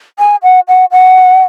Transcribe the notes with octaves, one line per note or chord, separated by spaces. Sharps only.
G#5
F#5
F#5
F#5